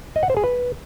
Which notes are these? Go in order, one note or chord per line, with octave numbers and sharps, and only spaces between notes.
D#5
F#5
C5
G#4
B4